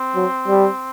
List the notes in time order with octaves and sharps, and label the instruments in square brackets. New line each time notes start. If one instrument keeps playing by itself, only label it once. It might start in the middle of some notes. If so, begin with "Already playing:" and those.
Already playing: [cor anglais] C4
[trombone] F#3
G3